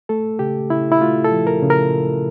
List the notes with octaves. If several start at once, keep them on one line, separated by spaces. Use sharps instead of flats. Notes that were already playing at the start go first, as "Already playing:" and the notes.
A3 A4
C#3 G4
C#3 E4
E4
A3 F4
A4
F3
A#4
C#3
A#4